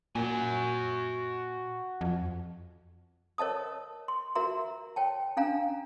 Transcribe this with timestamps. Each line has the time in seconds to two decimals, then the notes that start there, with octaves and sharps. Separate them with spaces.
0.15 A#2 F#4 G#5
2.01 F2
3.38 A#4 C#5 D#5 A5 D#6
4.08 C6
4.35 F#4 A#4 E5 A#5 C6
4.96 C#5 G5 A5
5.37 C#4 D4 F5 G#5 A#5